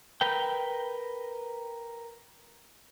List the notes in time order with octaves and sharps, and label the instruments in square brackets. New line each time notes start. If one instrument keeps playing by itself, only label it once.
[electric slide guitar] A#4 B4 G5